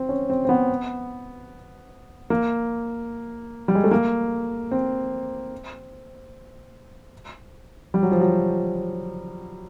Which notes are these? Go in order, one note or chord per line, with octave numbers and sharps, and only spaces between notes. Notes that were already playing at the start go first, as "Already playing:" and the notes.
Already playing: C4
C#4
C4
C4
B3
A#3
G3
G#3
A3
A#3
C4
G3
F#3
F3
F#3